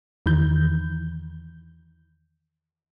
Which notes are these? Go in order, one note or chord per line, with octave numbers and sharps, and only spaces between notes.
E2 D#3 E3 G6